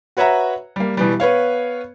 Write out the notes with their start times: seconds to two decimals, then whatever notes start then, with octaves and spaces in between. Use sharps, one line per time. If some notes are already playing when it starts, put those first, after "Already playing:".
0.17 F#4 B4 C#5 E5 F#5 A#5
0.76 G3 A#3
0.97 B2 E3 G3
1.20 B3 B4 C#5 F5